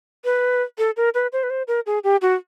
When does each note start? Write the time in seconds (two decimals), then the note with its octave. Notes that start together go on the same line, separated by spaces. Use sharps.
0.25 B4
0.78 A4
0.97 A#4
1.14 B4
1.33 C5
1.43 B4
1.50 C5
1.68 A#4
1.86 G#4
2.04 G4
2.22 F#4